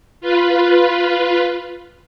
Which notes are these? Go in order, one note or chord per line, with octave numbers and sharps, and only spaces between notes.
F4 B4